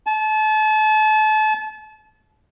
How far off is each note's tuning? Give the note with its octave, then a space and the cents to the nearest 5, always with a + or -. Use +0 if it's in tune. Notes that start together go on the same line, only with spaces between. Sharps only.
A5 -35